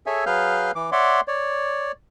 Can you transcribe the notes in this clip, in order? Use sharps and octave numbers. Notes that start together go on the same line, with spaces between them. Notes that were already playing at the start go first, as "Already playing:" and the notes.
G#4 A4 C#5 E5 G#5
F#3 G#4 B4 F5 F6 G6
E3 D6
C#5 D5 E5 F#5 C6 D6
C#5 D5